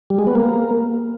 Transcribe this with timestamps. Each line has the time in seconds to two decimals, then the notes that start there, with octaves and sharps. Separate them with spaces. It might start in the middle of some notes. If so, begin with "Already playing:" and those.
0.10 G3
0.19 G#3
0.27 B3
0.35 A#3